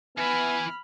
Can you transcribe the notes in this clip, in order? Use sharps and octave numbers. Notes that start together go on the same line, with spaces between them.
E3 B3 E5 G#5 B5 F6